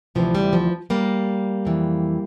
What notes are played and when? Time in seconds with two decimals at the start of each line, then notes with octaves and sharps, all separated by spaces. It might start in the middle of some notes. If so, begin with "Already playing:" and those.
0.15 D2 C3 E3 F3
0.35 G3
0.53 F3
0.90 G3 A#3
1.65 F2 E3